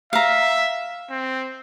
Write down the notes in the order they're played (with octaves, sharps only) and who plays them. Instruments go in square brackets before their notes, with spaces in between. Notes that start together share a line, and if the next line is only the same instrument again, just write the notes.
[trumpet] E5 [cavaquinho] F5 A#5
[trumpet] C4